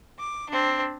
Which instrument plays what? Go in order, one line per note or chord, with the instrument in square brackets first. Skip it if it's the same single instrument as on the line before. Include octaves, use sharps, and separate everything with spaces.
[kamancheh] D6
C4 D4